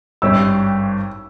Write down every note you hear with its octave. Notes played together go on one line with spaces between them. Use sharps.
G#1 G2 G3 C#4 G4 E6